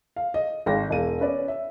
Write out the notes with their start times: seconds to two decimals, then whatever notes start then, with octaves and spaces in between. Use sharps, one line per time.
0.16 F5
0.34 D#5
0.66 G#1 F5 G5 A#6
0.90 E1 F5 D#7
1.20 C#4 B4 D5
1.48 E5